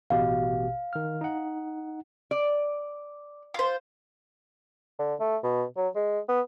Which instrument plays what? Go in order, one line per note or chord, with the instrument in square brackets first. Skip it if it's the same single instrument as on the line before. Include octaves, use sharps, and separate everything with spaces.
[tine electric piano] A1 B2 G4 [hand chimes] F5
[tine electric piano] D#3 F6
D#4 F#5
[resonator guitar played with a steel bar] D5
[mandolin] F4 C5
[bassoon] D3
A3
B2
F#3
G#3
B3